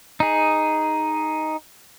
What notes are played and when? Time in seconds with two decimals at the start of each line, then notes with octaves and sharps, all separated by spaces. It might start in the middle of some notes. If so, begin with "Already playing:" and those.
0.20 D#4 G#4